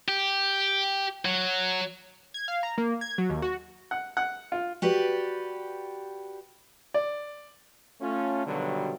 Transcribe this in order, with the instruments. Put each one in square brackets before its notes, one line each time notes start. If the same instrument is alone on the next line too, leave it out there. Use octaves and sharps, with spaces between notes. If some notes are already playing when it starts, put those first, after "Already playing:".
[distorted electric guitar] G4
F#3
[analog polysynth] G#6
F5
A#5
A#3
G#6
F#3
D#2
F#4
[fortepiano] F#5
F#5
F4
[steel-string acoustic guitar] F#4 G4 B4 D5
[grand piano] D5
[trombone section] A3 C#4 F4
G2 B2 D3 D#3 F#3 G3